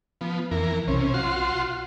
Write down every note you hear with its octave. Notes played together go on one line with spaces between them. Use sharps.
F3 B3
F2 E3 A#4
B1 C3 C#4
F4 F#4 C6